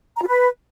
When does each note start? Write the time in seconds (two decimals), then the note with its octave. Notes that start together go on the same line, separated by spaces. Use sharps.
0.16 A#5
0.22 F4
0.28 B4